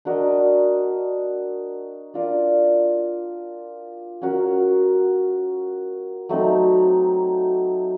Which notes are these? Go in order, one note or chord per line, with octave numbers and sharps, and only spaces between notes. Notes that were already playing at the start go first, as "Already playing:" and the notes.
D4 F#4 A#4 D#5
D4 F4 A#4 D5
C#4 F#4 A#4
F#3 A3 C4 D#4